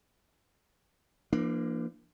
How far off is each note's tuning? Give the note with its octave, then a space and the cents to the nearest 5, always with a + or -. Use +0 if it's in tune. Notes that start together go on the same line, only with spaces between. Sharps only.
F3 -45 A#3 +10 D4 +15